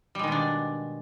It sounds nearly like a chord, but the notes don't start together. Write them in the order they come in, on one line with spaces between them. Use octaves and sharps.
G3 G#3 D#3 B2 D4